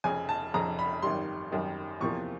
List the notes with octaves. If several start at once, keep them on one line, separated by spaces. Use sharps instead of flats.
F1 F2 C#3 G#5
A5
F1 F2 C#3 A#5
B5
G#1 F#2 D#3 G3 C6
G#1 F#2 D#3 G3
E2 C3 F3 A#3 C#6